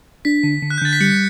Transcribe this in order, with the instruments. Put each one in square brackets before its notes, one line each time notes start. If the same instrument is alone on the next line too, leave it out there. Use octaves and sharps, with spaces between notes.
[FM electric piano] D4 [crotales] B6
[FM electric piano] D3
D3
[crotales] F#6
G6
[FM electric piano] D3 [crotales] A6
[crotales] B6
[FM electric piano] G3 [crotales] C#7